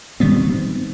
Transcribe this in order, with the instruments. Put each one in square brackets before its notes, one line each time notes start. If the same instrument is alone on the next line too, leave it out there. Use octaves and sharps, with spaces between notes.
[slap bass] D#3 G3 B3 C4